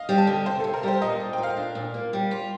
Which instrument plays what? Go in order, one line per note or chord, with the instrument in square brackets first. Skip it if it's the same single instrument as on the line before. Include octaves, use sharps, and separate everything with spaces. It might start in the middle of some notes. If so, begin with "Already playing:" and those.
Already playing: [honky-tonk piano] D#5 F5
[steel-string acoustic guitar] G3
[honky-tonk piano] A5
[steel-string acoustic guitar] D3
[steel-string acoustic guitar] C3 [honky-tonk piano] C5
[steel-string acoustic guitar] C3 [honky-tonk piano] A4
[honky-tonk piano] A#4
[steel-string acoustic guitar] G3 [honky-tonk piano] C5
[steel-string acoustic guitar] A#2 [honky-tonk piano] D#5
[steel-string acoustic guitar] A#2
[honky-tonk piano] G5
[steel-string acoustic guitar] A#2
[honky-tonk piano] F5
[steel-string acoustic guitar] D4
A#2
A#3
G3
F4